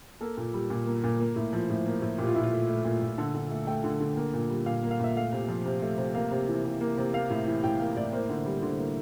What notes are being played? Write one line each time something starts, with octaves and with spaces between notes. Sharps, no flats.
A#3 A4
A#2
G3
A#2
A#3
A#2
A#3
A2
F3
A2
A#3
A2
A#2 G4
F4
A#2 E4
F4
A3
A3
A#2
A#2
D3 A4
D3
A3
A3 G5
D3
D3
A#3
A#2
G3
A#2 F5
A#3
F5
A#2 E5
A3 F5
C3
F3
C3
A3
C3
A#3 F5
C3
E3
C3
A#3
C3
A#3 F5
A2
E3
A2 G5
A#3 F5
A2 D5
A#3 C5
D3
G3
D3
A#3